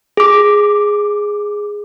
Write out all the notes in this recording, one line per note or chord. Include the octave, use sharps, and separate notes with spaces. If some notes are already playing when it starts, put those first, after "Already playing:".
G#4 D6